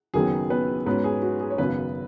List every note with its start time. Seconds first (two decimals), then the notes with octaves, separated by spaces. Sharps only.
0.14 F#1 F#2 D#3 F#3 B3 G#4
0.50 B3 B4
0.86 G#2 F#3 B3 C#4 B4
1.04 G#4
1.22 F#4
1.41 G#4
1.50 C#5
1.58 G#1 F#2 C#3 B3 B4